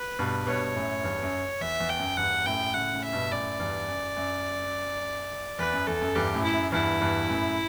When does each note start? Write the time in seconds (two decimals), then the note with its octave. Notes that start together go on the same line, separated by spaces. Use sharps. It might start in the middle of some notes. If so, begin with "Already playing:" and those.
Already playing: B4
0.19 G2 B2
0.47 G2 B2 C#5
0.76 F#2 A2
1.04 E2 G2
1.22 F#2
1.61 E2 E5
1.80 E2
1.89 G5
1.99 F#2
2.17 E2 G2 F#5
2.45 F#2 A2 G5
2.74 A2 C#3 F#5
2.93 A2 C#3
3.03 E5
3.12 G2 B2
3.31 F#2 A2 D5
3.59 E2 G2
3.88 F#2
4.16 F#2
5.59 E2 B4
5.73 F#2
5.87 E2 A4
6.01 F#2
6.15 E2 G2 G4
6.34 F#2 A2
6.44 E4
6.53 F#2
6.72 E2 G2 E4
7.01 E2 G2
7.29 F#2 A2